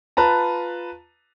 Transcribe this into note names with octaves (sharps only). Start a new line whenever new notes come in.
F4 B4 A5 A#5